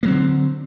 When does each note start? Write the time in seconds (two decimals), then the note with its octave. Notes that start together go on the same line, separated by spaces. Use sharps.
0.03 A#3
0.05 F#3
0.08 C4
0.10 D3